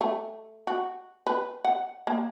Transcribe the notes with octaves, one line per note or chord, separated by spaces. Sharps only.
A3
F#4
B4
F#5
A#3